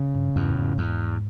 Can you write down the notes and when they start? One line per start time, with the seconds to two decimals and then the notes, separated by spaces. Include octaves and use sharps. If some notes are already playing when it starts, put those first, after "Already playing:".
Already playing: C#3
0.15 G2
0.36 E2 G2
0.50 A2
0.57 G#2
0.78 E2